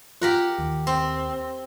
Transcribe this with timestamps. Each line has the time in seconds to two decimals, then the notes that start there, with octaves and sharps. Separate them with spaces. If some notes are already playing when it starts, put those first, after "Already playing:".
0.21 F4 G4 A#4 F#5
0.59 D#2
0.87 C4